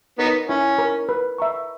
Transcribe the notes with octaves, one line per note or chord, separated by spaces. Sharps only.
B3 D#4 A#4 C#5
C#4 E4
A#4 C#5
B4
E5 A#5 C#6